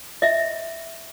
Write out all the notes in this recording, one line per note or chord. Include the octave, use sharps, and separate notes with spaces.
D#5 E5